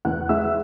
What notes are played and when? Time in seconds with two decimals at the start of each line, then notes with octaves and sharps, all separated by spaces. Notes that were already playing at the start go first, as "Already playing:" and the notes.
0.05 E2 F#5 F#6
0.29 G#3 E5 E6